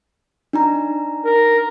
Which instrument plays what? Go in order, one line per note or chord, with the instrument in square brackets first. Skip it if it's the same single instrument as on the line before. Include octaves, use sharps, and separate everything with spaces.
[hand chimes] D4 D#4 A#5
[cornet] A#4